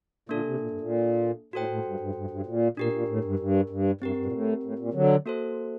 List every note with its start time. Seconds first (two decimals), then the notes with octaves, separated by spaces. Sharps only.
0.29 A#2 D3 A#3 D4 A4
0.45 C3
0.60 A#2
0.71 G2
0.81 A#2
1.53 A2 F#4 A4 C5 G5
1.69 A2
1.85 G2
2.00 G2
2.15 G2
2.31 G2
2.46 A#2
2.77 A#2 D4 G4 A#4
2.93 A#2
3.08 A2
3.24 G2
3.39 G2
3.70 G2
4.01 G2 C4 G4 A#4
4.17 G2
4.26 A#2
4.32 A2
4.63 A2
4.79 A#2
4.94 D3 F#3
5.26 A#3 F#4 A4 C5